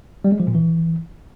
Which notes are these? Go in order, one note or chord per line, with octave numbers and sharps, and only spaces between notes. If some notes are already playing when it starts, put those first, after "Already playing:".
G3
G#3
F3
A#2
E3